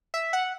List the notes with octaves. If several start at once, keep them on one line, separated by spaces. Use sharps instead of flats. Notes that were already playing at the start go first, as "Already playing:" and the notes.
E5
F#5